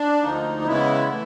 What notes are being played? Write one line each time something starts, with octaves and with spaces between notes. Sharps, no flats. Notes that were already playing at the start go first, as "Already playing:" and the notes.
Already playing: D4
D2 D3 F3 A#3 D#4
C#3 E3 G#3 B3 E4
E3 A3